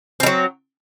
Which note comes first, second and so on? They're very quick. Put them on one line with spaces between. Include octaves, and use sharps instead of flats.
C4 G3 F#3